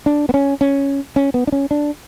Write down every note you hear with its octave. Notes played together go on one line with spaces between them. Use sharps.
D4
B3
C#4
C#4
C#4
B3
D4
C#4
D4